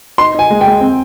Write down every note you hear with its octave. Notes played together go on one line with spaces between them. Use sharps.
D#4 C6
D#4 G#5
G#3
G#3 G5
C4